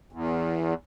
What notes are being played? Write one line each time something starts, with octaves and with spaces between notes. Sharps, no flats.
E2